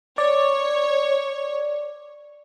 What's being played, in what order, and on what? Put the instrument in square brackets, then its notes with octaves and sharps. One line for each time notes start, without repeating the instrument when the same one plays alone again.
[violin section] C#5 [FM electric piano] D5